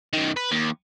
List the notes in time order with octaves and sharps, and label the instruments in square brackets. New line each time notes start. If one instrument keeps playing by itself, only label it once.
[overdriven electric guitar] F#2 D#3
B4
D#2